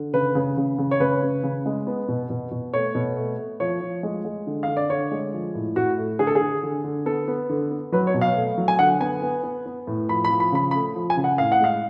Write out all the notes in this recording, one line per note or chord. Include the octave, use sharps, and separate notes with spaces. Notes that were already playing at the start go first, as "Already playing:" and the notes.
Already playing: D3
C#3 B4
C#3
C#3
C#3
C#5
C#3 B4
C#3
C#3
G#3
B3
B2
B2
B2
A3 C#5
B2
A3
A3
F3 C#5
F3
G#3
G#3
D3
D3 F5
D5
D3 C#5
G#3
F3
A2
A2 F#4
A3
D3 G#4
A4
G#4
D3
D3
D3
B3 A4
B3
D3
B3
F#3 B4
C#5
B2
F5
A3
F#3
G#5
D3 F#5
B3 G#5
B3
B3
B3
A2
F3 B5
B5
F3
B5
C#3 B5
B5
A3
F3
G#5
C#3
F#5
A2 F5
F#5
G#3 F5